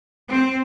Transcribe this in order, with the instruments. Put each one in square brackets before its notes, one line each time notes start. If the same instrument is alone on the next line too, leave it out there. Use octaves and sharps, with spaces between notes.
[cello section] C4